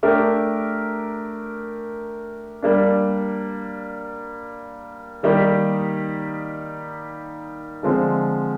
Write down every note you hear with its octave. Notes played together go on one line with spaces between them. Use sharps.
A3 D4 G4 A#4
G3 A#3 D4
D#3 G3 A#3 D#4 G4
D3 F3 G#3 C4